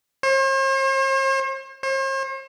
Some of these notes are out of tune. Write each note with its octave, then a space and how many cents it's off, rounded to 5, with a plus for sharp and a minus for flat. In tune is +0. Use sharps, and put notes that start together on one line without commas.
C5 +45
C5 +45